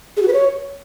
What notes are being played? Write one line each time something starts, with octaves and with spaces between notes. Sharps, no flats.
G#4
F#4
B4
C#5